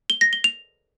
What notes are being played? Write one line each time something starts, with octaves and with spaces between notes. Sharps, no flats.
G7
A#6
G7
F7